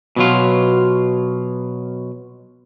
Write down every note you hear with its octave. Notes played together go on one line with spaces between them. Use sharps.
B2 F#3 F4